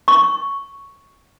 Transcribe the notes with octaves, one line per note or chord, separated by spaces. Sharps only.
C#6